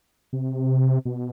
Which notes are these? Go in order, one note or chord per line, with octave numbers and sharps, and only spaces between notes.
C3
B2